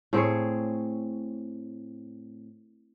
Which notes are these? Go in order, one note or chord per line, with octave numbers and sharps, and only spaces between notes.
A2 C4 G#4 C#5